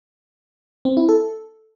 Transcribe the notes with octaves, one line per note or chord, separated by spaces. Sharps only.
C4
E4
A4